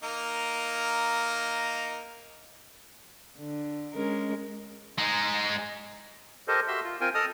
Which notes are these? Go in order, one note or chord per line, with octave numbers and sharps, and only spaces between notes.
A#3 D#4 A#4
D3
G#3 C#4 A#4
G#3 D#4
G4 A4 A#4 C5 D#5
F#4 G4 E5 C6 E6
F4
C4 F4 A#4 G5 G#5
A4 D#5 A5 D#6 F6